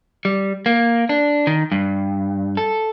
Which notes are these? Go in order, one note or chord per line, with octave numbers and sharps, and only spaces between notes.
G3
A#3
D4
D#3
G2
A4